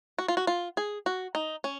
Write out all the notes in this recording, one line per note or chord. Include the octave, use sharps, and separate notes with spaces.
F#4
F4
F#4
F4
G#4
F#4
D#4
C#4